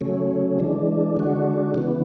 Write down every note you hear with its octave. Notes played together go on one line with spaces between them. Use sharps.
C#3 F#3 A3 C#4
E3 G#3 D4
D3 G#3 D4 F#4
C#3 E3 B3